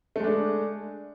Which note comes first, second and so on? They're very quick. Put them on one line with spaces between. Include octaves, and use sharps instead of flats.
A3 G#3 D4